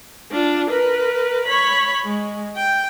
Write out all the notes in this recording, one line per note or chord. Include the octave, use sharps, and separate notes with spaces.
D4 F4
A#4 B4
C#5 B5
G#3
G5